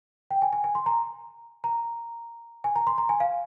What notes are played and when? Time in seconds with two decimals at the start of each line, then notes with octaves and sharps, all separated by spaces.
0.31 G5
0.42 G#5
0.53 G#5
0.64 G#5
0.75 C6
0.86 A#5
1.64 A#5
2.64 G#5
2.76 A#5
2.87 C6
2.98 A#5
3.09 G#5
3.20 F5